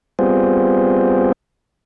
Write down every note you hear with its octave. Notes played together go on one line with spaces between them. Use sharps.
G3 B3 C4 F4 G#4 C5